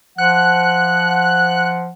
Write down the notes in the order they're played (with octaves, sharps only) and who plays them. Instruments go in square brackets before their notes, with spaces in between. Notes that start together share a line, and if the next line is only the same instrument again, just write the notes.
[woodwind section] F3 F#5 [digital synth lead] F#6